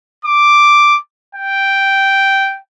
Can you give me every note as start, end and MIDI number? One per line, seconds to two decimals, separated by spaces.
0.25 0.97 86
1.35 2.57 79